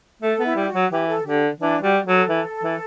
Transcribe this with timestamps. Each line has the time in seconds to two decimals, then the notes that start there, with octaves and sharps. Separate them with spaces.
0.22 A3 A4
0.39 B3
0.45 E4
0.56 G3 G4
0.68 F#4
0.74 F#3
0.91 E3 G4
1.08 A4
1.25 D3 G4
1.60 E3 D4
1.82 G3 F#4
2.06 F#3 A4
2.29 E3
2.63 E3